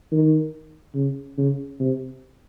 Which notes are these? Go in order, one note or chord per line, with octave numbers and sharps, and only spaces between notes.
D#3
C#3
C#3
C3